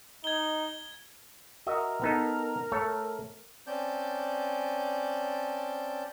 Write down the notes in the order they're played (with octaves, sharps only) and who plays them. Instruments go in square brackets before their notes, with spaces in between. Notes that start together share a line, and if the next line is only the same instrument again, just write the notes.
[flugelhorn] D#4 [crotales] G#6 G7
[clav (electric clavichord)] F#4 D#5 E5 [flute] A#4
[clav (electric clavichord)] B3 D#4 A4
A3 A4 C#5
[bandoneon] C4 C#4 D5 A5 G6